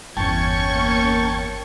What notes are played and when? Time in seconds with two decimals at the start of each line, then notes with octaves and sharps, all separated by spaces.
0.17 G1 E2 E3 C#4 G5 A5 C#6 G#6
0.71 A#3